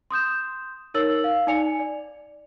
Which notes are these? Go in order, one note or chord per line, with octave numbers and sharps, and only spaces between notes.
C6 D#6 G6 E7
D#4 A#4 C#5 E6 A6 F#7
F5
D#4 D5 G#5 C#7 F7
D5